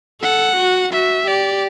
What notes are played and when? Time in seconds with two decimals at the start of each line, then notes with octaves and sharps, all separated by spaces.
0.22 A4 F#5
0.57 F#4
0.92 F#4 E5
1.27 G4 D5